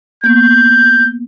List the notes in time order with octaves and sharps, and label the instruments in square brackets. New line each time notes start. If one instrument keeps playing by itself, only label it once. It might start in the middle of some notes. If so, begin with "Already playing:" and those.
[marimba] A#3 B3 [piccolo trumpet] G6